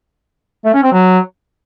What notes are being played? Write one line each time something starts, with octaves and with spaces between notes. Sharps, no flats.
A3
C#4
C4
F#3